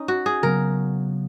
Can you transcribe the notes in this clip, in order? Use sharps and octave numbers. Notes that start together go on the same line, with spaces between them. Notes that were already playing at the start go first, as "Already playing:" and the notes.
Already playing: C#4 D#4
F#4
G#4
C#3 F#3 B3 A#4